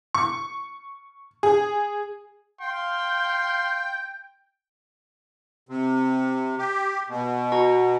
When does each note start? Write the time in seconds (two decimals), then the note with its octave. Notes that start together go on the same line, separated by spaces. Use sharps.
0.14 C#6
1.43 G#4
2.61 F5 G5 C6
5.69 C3
6.58 G4
7.09 B2
7.52 F#4 A#5 C#6